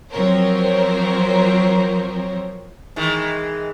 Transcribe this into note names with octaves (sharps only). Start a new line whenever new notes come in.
F3 F#3 C4 A#4 C5 C#5
D#3 E3 G#3